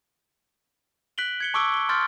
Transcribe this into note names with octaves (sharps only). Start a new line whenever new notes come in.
F#6 B6 D7 F#7 G7
G#6 C#7 G7
A5 C#6 D6 E6 D7
G7
C6 D6 F6 G6 A6 D7